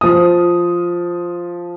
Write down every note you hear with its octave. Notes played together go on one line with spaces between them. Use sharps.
F3 D#6